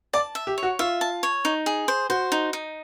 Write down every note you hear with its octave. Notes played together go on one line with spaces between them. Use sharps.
D5 A5
E5
G4
C#5
F#4
F4 E5
A5
C#5
D#4
G#4
C5
F#4 C5
D#4
D#4